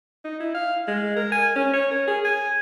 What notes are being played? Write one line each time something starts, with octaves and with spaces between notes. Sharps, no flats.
D#4
E4
F5
G#3
A#4
G#5
C#4
C#5
A#4
G#4
G#5